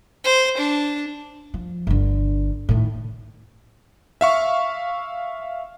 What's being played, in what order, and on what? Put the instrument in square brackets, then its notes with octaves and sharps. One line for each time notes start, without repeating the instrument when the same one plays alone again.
[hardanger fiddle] C5
D4
[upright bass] F3
G1 D3
A2 D#3
[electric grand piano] E5 F5 C#6